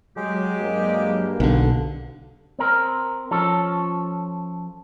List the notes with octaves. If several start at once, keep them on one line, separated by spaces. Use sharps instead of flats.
F#3 G#3 G4
G2 A#3
B1 B2 D3
C4 A#4
F3 C#4 A4